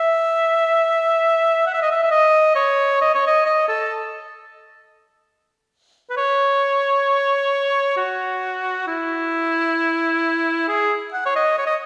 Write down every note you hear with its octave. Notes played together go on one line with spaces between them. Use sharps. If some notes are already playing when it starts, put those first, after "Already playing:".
Already playing: E5
F#5
E5
D#5
E5
E5
D#5
C#5
D#5
C#5
D#5
D#5
A4
B4
C#5
F#4
E4
G#4
F#5
C#5
D#5
C#5
D#5